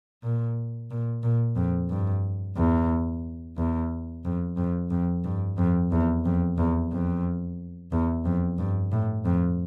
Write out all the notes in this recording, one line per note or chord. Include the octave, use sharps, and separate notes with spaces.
A#2
A#2
A#2
F2
G2
E2
E2
F2
F2
F2
G2
F2
E2
F2
E2
F2
E2
F2
G2
A2
F2